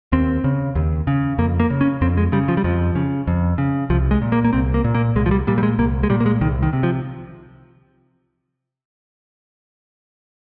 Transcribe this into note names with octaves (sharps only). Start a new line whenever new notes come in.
D#2 C4
C#3
D#2
C#3
F2 A#3
A#3
C#3
C#4
F2 C4
G#3
C#3 G3
F3
G3
F2 F3
C#3
F2
C#3
C2 F3
G#3
A#2
A#3
A#3
C2 C4
A#3
A#2
A#3
C2 G#3
F3
G3
A#2 G3
G3
G#3
C2 A#3
G#3
A#2 G3
A#3
G#3
C2 D#3
D#3
C3
F3